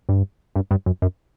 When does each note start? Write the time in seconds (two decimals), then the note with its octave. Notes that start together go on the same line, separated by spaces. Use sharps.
0.09 G2
0.56 G2
0.71 G2
0.86 F#2
1.02 F#2